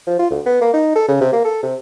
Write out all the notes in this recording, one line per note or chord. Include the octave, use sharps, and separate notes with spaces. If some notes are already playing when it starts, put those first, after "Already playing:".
F3
F4
D2
B3
A#3
D#4
A4
C#3
C3
A#3
A4
C3